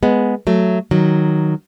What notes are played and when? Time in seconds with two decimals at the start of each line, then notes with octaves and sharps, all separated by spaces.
0.03 G#3 B3
0.47 F#3 A3
0.91 D#3 F#3